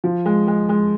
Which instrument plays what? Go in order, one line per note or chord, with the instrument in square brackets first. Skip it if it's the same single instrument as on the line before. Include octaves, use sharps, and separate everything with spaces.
[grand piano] F3
G#3
G#3
G#3